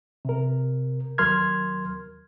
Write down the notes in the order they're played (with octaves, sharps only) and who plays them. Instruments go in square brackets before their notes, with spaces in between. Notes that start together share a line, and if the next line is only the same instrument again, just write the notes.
[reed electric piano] C3 A#4
D#2 F#3 A#4 C6 F6 G#6